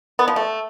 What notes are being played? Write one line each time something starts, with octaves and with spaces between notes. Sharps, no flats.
B3
F3
A3